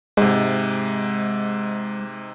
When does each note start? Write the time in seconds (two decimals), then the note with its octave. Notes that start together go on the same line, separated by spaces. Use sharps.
0.17 G#2 C3 G#3